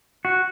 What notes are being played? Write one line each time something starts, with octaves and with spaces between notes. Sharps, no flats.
F#4